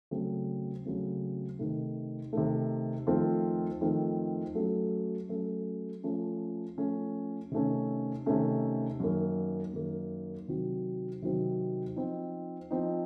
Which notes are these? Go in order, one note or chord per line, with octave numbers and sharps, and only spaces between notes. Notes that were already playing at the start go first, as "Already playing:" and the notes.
C#3 F#3 A3 C4
C#3 F#3 A3 C4
C3 D#3 A3
C3 D#3 A3
F2 D#3 A3 C4 F4
F2 D#3 A3 C4 F4
F#3 A3 C#4 A4
F#3 A3 C#4 A4
F3 A3 C#4
F3 A3 C#4
C3 D#3 A3 C#4
C3 D#3 A3 C#4
F#2 D#3 A#3
F#2 D#3 A#3
C3 D#3 F#3 C4 F#4
C3 D#3 F#3 C4 F#4
F3 C4 D#4
F3 C4 D#4